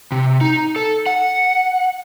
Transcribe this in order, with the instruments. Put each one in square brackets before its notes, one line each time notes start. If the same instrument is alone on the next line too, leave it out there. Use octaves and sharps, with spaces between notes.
[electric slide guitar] C3
D#4
A4
F#5